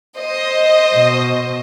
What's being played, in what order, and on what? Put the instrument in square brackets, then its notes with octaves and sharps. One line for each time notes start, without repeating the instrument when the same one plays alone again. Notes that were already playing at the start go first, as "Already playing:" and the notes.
[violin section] C5 D#5
[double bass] B2